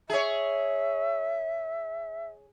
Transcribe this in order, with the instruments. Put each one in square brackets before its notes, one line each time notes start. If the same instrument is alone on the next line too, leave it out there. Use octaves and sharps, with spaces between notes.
[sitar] G#4 C#5 [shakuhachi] E5